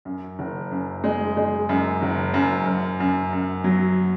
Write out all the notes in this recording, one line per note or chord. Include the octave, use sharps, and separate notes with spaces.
F#2
F#1
F#2
G#3
G#3
F#2
F#1
F#2
F#2
F#2
F#2
F#3